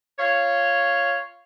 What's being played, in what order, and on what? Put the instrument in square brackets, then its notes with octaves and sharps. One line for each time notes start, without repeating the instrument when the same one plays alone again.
[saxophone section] F4 C#5